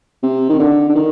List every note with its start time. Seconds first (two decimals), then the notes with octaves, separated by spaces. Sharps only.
0.23 C3
0.50 D#3
0.59 D3
0.89 D3
0.95 D#3